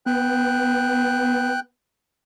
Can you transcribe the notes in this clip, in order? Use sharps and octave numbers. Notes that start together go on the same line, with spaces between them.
B3 G5 F#6